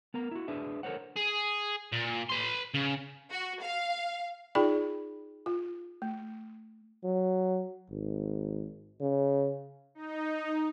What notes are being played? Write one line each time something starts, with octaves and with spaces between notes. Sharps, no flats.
B3 A#4 A#5
E4 F#4
D4 G#4 B4 E5
A4 A#4 C5 C#5 F#5
G#4
A#2
B4 C6
C#3
F#4
F5
D#4 F4 G#4 D5 G5 B5
F4
A3
F#3
G#1
C#3
D#4